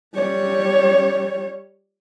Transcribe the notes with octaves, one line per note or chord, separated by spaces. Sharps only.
G3 C#5